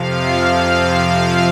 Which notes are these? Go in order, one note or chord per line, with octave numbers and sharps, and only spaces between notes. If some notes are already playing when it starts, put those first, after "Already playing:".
Already playing: F2 C3 F3 F5